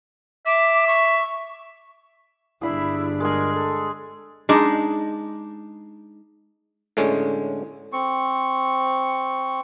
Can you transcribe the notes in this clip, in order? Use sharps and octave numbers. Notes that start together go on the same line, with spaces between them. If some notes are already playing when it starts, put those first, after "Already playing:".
E5 D6
C#6
G1 D4 E4 G#4 B5
G#3 G#4 A#4
A4
G#3 D4 D#4
A2 D3 G#3 C#4
C4 C#6